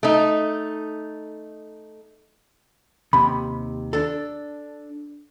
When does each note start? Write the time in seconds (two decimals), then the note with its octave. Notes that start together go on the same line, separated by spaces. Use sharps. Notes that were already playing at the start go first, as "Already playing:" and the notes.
0.03 A3 D#4
3.13 D#2 C3 B5
3.93 D4 A4 A6